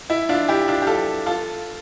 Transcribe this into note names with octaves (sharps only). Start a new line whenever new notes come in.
E4
D4 F4
E4 G4
D4 F4
G4
F4 A4
F4 A4